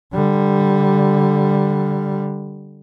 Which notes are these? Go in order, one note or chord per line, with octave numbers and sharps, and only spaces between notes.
D3 G3